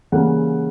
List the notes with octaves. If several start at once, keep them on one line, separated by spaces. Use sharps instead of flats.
C#3 E3 G3 A#3 F#5